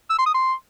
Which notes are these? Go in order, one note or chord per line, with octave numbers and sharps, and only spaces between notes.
E6
C6
D#6
C6